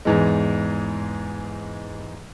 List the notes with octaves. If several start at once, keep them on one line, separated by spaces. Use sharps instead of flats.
E2 G#2 E3 G#3